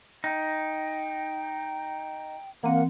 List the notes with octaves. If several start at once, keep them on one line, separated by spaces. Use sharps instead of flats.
D#4 G5
E3 A#3 C4 F#5